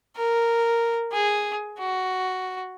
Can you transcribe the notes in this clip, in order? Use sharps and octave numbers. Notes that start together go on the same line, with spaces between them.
A#4
G#4
F#4